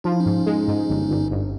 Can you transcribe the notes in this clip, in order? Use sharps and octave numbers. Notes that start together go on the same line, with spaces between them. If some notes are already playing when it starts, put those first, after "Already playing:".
F3 D#4
E4
C#4 D#4
G#2
G#3
G#2
G1
G1
G1